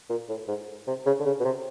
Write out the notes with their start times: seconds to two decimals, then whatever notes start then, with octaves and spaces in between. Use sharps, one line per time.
0.10 A#2
0.29 A2
0.48 G#2
0.87 C3
1.06 C#3
1.20 D3
1.26 C#3
1.40 B2
1.45 C3